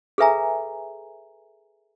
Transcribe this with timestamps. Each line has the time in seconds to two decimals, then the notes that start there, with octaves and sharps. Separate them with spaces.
0.18 G#4 A4 B4 E5 G#5 A#5